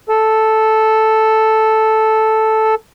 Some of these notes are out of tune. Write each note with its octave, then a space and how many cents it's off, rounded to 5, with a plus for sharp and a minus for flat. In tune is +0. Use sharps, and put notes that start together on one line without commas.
A4 -5